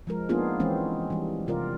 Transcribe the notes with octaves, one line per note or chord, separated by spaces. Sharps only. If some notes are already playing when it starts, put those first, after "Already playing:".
F3 G#3 A#4
A#3 B3 D4 D#4 F4 G#4
E3 G#3 C4 C#4
E3 G3
C3 F4 A#4 D5